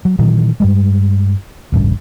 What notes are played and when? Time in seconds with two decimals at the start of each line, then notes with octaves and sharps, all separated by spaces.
0.05 F#3
0.19 A#2 D#3 E3 F#3
0.60 G2 G3 G#3
1.72 E1 A1 G2 C#3